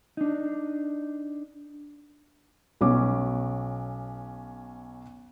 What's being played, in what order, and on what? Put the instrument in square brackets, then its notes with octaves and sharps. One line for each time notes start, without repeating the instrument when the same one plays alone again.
[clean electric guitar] D4 D#4
[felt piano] B1 C#4 D6